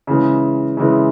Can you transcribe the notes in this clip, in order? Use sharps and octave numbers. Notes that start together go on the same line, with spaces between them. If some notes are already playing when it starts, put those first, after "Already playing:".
C#3 E3 G#3
C#3 E3 G#3